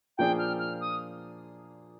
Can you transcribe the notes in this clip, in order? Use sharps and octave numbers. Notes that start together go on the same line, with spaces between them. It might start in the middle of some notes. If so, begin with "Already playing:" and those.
A#2 F3 A#3 D4 G#4 G5
F6
F6
D#6